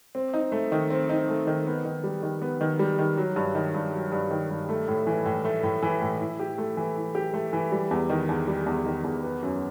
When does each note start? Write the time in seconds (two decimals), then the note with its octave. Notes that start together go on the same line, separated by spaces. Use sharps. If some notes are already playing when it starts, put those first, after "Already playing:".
0.15 C4
0.34 D#4
0.52 A3
0.72 D#3
0.90 C4
1.09 D#4
1.28 A3
1.47 D#3
1.66 B3
1.85 D#3
2.04 G3
2.23 D#3
2.42 B3
2.61 D#3
2.79 G3
2.99 D#3
3.17 F#3
3.36 G2
3.55 D#3
3.74 G2
3.93 F#3
4.12 G2
4.31 D#3
4.50 G2
4.69 A3
4.88 A2
5.07 E3
5.26 A2
5.45 A3
5.63 A2
5.82 E3
6.01 A2
6.20 E4
6.40 G4
6.58 A3
6.77 E3
6.96 E4
7.15 G4
7.34 A3
7.53 E3
7.72 G3
7.91 E2
8.10 D#3
8.29 E2
8.47 G3
8.66 E2
8.86 D#3
9.04 E2
9.23 B3
9.43 F#2